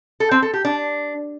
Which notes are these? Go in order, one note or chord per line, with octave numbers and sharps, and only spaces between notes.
A4
C4
A4
G4
D4